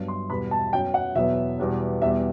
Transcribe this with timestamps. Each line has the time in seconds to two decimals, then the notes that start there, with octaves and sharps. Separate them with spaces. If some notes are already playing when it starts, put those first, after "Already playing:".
Already playing: G2 F#3 B3
0.08 C6
0.30 E2 B2 G3 B3 B5
0.51 A5
0.72 F#2 F#3 B3 G5
0.94 F#5
1.15 E2 B2 F#3 B3 E5
1.58 E2 B2 G3 B3
2.01 E2 B2 G3 B3 E5